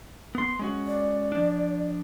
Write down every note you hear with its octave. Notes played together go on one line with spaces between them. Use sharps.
B3 C6
G#3 C#4 F#4
D5
F3 D4